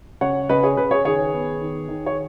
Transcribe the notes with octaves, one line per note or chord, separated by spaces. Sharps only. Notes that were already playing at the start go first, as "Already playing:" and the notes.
C#3 C#5 F#5
C#3 B4 D#5
G#4 C#5
C#3 B4
G#4 C#5
D#3 G#4 C#5
B3
D#3
D#3
C#5